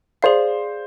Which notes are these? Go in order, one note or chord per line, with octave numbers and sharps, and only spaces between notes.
G#4 C5 D5 F5